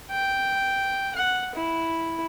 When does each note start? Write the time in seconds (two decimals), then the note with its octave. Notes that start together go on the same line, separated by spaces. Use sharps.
0.10 G5
1.15 F#5
1.55 E4